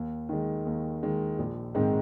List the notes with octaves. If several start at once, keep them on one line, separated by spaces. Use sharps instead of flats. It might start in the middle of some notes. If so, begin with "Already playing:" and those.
Already playing: D#2
D#3 G#3
D#2
D#3 G#3
A#1
G#2 D#3 G#3 C4